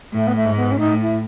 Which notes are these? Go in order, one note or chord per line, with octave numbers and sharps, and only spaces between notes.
A2 A3
B3
A3
G#2
B3
C#4
A2 D#4
E4